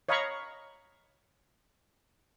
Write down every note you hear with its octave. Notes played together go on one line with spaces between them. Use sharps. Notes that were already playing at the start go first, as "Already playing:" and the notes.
C#5 D#5 F5 A#5 B5 C#6